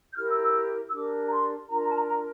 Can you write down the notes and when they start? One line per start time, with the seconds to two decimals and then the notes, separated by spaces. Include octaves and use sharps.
0.12 G6
0.17 E4 G4 A#4 F6
0.30 E6
0.42 E6
0.88 E6
0.92 D4 G4 A#4 D6
1.24 A#5
1.31 C6
1.68 D4 F4 A#4 A#5
1.81 A#5
1.89 A5
1.93 A#5
2.06 A#5